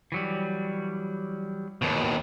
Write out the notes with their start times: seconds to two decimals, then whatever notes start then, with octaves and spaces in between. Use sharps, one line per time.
0.12 E3 F#3 G3
1.82 D#2 B2